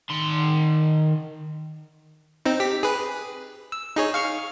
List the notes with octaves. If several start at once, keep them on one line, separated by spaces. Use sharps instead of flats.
D#3 C6
C4 D#4
G4 B6
G#4 B4
E6
D#4 G#4 C#5
F5 C#6 F6